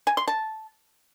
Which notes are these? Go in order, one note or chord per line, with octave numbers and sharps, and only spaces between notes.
G#5
C6
A5